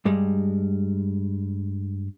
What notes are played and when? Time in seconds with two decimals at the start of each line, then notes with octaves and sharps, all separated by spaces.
0.05 G2 G3 G#3